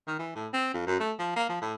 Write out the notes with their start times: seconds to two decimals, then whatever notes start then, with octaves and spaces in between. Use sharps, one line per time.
0.07 D#3
0.19 E3
0.36 A2
0.53 C4
0.74 F2
0.87 F#2
1.00 A3
1.19 F3
1.36 A#3
1.49 F3
1.62 A2